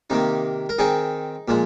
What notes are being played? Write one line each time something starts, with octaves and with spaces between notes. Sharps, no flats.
C3 D#3 A#3 D#4
A#4
D#3 C4 D#4 G#4
A#2 F3 G#3